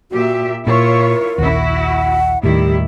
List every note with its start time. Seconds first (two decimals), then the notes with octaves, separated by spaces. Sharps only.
0.11 A#2 F#4 G4 E5
0.67 A#2 E4 F4 A#4 C#5
1.38 A#1 D#2 E4 F#4
1.83 F#5
2.43 D#2 A2 D#3 G3 E4 G4